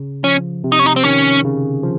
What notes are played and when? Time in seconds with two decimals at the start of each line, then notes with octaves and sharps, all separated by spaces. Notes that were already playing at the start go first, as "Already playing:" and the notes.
Already playing: C#3
0.24 F3 C#4
0.64 C3
0.72 D#4
0.79 C#4
0.86 D#4
0.96 C4
1.04 D#3 C#4
1.44 C#3
1.83 F3